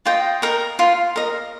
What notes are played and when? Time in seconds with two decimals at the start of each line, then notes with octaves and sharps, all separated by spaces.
0.05 F4 D#5 G5
0.42 A#4 D#5
0.79 F4
1.16 A#4 D#5